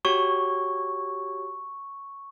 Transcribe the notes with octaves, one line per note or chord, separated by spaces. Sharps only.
F#4 G4 C#5 C#6